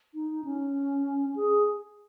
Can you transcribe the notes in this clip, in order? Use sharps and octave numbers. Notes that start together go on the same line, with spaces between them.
D#4
C#4
G#4